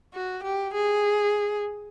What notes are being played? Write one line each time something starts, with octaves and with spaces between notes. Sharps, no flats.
F#4
G4
G#4